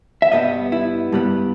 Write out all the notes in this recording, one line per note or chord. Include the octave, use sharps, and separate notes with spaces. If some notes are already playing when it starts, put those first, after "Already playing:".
E5
G2 G3 B3 D#5
E4
G2 G3 B3